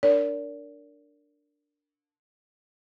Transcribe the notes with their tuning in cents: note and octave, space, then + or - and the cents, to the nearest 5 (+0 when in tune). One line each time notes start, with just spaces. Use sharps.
D4 +0 A#4 -15 D5 -35